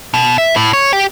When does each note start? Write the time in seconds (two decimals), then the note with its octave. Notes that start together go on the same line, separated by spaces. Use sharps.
0.14 B2
0.38 E5
0.56 A2
0.73 C#5
0.93 G4